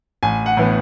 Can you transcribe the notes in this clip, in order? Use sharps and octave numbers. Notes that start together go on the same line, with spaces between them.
A1 G#5
F#5
A2 E3 B3